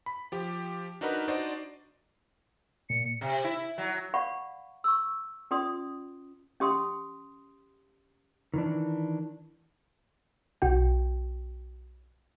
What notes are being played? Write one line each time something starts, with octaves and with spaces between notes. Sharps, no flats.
B5
F3 G4
D4 D#4 F#4 A#4 B4
D4 D#4 F#4 C5 D5 D#5
A#2 C#7
C3
E4
F#3
D5 F5 F#5 B5 C#6
C#6 E6
C#4 F4 D5 C6 D#6
C#4 G4 C6 D#6
D#3 E3 D4
B1 F#4 G5